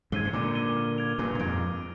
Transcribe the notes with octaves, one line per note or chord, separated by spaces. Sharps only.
G#2 C3 G#6 D#7 G7
C3
A#2 D3 D6
G#6 D#7 G7
F6
G#6 D7 F7
G2 A#2 F6
A#2
F2 G#2 G#6 D7 F7
G#6